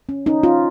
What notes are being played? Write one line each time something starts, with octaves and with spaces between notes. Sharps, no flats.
C#4
C#4 D#4
C#4 F4